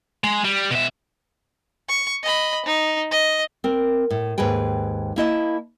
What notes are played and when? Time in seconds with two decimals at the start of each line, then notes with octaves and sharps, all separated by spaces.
0.24 G#3
0.44 G3
0.71 B2 E5
1.89 C#6
2.23 D#5 B5
2.66 D#4
3.11 D#5
3.64 C4 A#4
4.10 A2
4.38 D#2 G#2 G#4 B4 G5
5.16 A#3 E4 D#5 A5